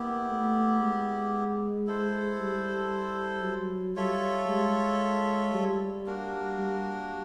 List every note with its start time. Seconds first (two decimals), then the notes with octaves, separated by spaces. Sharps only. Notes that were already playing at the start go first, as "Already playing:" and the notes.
Already playing: A#3 B3 E4 G4
0.29 A3
0.81 G#3
1.87 E4 A4 C5
2.39 G3
3.43 F#3
3.96 G3 F4 A4 C#5 E5
4.48 G#3
5.54 G3
6.06 A#3 D4 F#4 A#4
6.59 G3